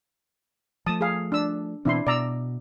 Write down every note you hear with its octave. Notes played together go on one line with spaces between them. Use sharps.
F3 A3 A5 D#6
G#4 F5
D4 E6
B2 E3 C4 D4 E4 C6
B2 D5 A#5 E6